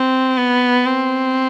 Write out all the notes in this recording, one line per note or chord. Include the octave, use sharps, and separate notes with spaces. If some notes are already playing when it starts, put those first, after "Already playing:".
Already playing: C4
B3
C4